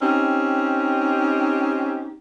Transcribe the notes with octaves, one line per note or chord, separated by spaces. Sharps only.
C4 C#4 D#4 G4